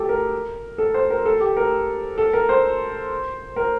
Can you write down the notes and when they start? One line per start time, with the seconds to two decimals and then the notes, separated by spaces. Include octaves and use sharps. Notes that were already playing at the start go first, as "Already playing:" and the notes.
Already playing: G4 A4
0.09 A#4
0.78 A4
0.94 C5
1.10 A#4
1.25 A4
1.40 G4
1.57 A#4
2.18 A4
2.33 A#4
2.49 C5
3.56 A#4